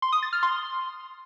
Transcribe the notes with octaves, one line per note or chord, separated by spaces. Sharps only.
C6
D#6
A6
F6
C6